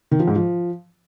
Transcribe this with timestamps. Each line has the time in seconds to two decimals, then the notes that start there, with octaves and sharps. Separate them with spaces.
0.11 D#3
0.19 F3
0.27 G#2
0.35 F3